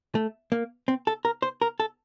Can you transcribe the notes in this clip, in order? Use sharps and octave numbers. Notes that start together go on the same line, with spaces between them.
A3
A#3
C4
A4
A#4
C5
A#4
A4